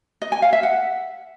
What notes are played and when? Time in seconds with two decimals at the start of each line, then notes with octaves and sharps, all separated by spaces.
0.22 D#5
0.32 G#5
0.42 F5
0.53 E5
0.63 F#5